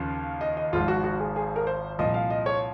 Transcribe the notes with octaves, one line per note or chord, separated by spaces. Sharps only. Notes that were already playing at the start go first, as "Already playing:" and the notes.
Already playing: D#2 C#3 F3
D#5
D#5
G#1 G#2 F3 F4
F#4
F#4
G#4
G#4
A#4
C5
C2 A#2 F3 D#5
F5
D#5
C#5